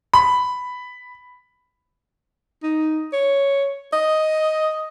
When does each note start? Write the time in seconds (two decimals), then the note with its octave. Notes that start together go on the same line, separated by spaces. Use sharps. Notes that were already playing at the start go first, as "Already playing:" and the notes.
0.14 B5
2.63 D#4
3.13 C#5
3.93 D#5